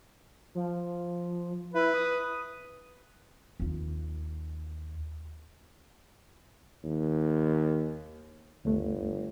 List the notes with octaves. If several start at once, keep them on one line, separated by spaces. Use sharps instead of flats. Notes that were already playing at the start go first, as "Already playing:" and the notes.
F3
E4 B4
D#6
D#2 F4
D#2
G1 D2 A3